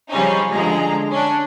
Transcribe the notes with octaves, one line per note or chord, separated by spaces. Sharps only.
C#3 F3 G3 C#4 D#4
D3 F3 G#3 A#5
C#4 D4